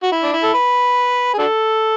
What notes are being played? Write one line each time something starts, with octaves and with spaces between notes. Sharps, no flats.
F#4
E4
D4
E4
A4
B4
G#4
D4 F#4 A4